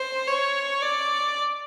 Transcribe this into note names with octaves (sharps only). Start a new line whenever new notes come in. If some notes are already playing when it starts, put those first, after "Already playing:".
Already playing: C5
C#5
D5